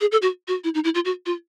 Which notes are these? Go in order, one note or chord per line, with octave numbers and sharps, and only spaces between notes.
G#4
A4
F#4
F#4
E4
D#4
E4
F4
F#4
F4